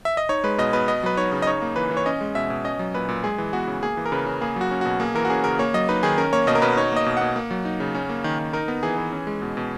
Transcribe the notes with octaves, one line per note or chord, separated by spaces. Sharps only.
E5
D#5
D#4 C#5
G#3 B4
B2 D#5
B2 B4
B3 D#5
F#3 B4
D#4 C#5
C#3
D#5
D#4 C#5
A#3
E3 B4
E3
C#5
C#4 D#5
G#3
B2 E5
B2
C#4 D#5
F#3
A#2 B4
A#2
G#3 G#4
E3
B3 F#4
C#3
A#3 G#4
E3
A#4
C#3 B4
C#3
A#3 G#4
F#3 F#4
C#4
B2 F#4
A#3 G#4
E3 A#4
F#4
C#4 G#4
C#3 A#4
A#3 C#5
F#3 D#5
D#4 B4
D#3 G#4
C#4 A#4
A#3 C#5
B2 D#5
A#4
B2 B4
D#4 C#5
A#3 D#5
B2
B2 F#5
A#3
F#3
D#4
C#3
C#4
A#3
D#3
D#3
D#4 A#4
B3
E3 G#4
E3
C#4
G#3
B2
B2